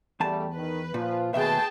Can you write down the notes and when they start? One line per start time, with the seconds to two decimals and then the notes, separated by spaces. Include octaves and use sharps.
0.20 E2 G3 A3 A5
0.55 D#3 B4
0.94 A#2 F3 F4
1.34 D#2 B2 A3 G#4 B4 E5 G5 A5